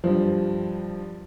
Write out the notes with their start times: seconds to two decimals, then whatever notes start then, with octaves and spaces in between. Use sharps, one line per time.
0.04 G2 F3